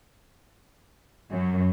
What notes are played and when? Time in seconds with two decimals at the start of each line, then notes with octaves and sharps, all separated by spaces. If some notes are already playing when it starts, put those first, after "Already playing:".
1.30 F#2